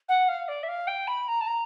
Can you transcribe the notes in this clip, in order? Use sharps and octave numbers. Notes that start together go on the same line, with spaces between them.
F#5
F5
D5
E5
F5
G5
B5
A#5
A5
A#5